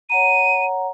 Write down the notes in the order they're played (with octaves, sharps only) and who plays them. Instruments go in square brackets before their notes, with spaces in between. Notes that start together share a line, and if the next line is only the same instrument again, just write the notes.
[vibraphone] C#5 F#5 A#5 [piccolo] D#7